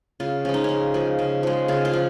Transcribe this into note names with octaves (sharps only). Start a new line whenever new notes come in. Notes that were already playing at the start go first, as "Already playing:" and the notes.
C#3 F4
F3 G#3 C#4
D#4
C#3 C#4
F3 G#3
C#3
F3 G#3
C#3 F4
F4
F3